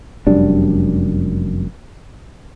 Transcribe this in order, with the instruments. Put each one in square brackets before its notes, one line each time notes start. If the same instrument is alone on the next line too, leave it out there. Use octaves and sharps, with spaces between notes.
[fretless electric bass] F1 F#2 G3 D4